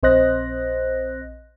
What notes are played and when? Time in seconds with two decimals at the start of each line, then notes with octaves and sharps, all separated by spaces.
0.03 A#1 C4 C5 D#5 F#6 A#6